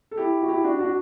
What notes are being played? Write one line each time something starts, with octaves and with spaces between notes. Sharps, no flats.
A4
E4 G4
F#4
E4 G4
D4 F#4
D4 F#4